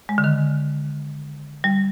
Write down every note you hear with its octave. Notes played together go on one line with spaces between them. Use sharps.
G#3
D3
D#3
G3